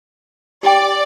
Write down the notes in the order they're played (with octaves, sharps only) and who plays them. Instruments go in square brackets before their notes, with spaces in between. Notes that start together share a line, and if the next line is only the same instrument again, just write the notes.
[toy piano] G4 G5 [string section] D5